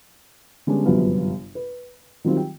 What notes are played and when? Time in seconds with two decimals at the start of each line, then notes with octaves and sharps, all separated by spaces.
0.67 D3 G3 G#3 B3 C#4 D4
0.85 G1 F#2 C3 F3 B3 F5
1.55 B4
2.24 D#3 F#3 G3 C4 F4
2.37 G5